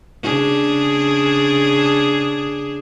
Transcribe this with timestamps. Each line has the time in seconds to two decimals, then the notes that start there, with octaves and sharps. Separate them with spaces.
0.23 C#3 D4 G#4